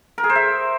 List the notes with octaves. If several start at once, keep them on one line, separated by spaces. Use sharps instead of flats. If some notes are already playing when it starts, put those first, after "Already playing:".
A#4
G#4
C5
E5